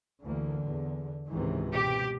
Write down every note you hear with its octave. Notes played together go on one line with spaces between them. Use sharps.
D2 D3 E3 A#3
E2
C#2 G#2 C3 D#3 E3
B2 G4